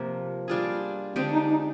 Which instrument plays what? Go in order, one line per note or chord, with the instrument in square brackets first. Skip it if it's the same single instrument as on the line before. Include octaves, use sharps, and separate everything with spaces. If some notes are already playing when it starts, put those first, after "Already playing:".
Already playing: [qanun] C3 F3 A#3
G3 D4 F4 G#4
[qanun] D3 G#3 D4 G4 [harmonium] C4
[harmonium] D#4
D#4